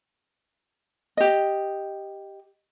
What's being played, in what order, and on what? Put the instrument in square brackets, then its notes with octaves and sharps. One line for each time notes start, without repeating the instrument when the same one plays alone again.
[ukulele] G4 D#5